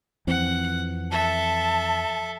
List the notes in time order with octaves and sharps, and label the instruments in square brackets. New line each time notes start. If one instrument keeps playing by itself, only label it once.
[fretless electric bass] F2 E3 C4 [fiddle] F#5
[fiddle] A4 E5 [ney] A5